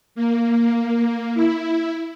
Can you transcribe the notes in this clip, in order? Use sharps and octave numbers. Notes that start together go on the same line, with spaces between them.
A#3
E4